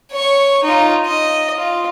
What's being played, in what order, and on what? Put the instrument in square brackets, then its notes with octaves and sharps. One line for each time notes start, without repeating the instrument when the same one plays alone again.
[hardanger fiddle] C#5 C#6
D#4 F4
D#5
F4